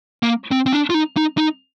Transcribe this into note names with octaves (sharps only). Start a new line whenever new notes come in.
A#3
C4
C4
D4
F4
D#4
D#4
D#4